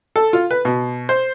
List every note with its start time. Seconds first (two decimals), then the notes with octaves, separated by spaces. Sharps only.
0.16 A4
0.33 F4
0.51 B4
0.65 B2
1.09 C5